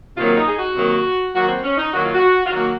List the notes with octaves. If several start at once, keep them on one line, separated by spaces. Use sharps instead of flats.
C3 D#3 F#3 A#3 F4
D#4
G#4
F#4
C3 D#3 F#3 A#3
D#3 F#3 A#3 F#4
C4
C#4
D#4
D#3 F#3 A#3 F#4
F4
F#4
F4
D#3 F#3 A#3 F#4